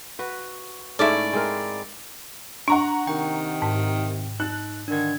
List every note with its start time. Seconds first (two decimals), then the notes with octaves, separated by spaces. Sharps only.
0.19 F#4 B4
0.99 G#2 A3 C#4 E4 D5
1.33 G#3 C4 A#4
2.68 D4 F#5 A#5 C#6
3.07 C3 D#3 G5
3.62 G#2
4.40 D#4 F#6
4.88 D3 D#3 D4 G#6